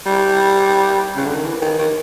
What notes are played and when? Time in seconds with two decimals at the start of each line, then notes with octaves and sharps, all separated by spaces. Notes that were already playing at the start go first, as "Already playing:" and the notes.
0.06 G3
1.16 C#3
1.26 D3
1.35 D#3
1.44 E3
1.62 D#3
1.79 D#3